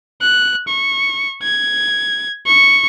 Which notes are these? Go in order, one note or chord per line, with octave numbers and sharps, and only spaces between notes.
F#6
C#6
G#6
C#6